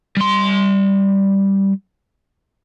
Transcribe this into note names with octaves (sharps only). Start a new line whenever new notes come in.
G3 C6